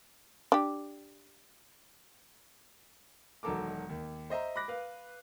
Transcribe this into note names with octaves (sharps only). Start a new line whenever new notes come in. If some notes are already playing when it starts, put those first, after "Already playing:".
D4 G4
E1 D#3 F#3 A4 A#4 D6
D#2
C5 D#5 E5 A#5
B5 D6 F#6 A#6
B4 F5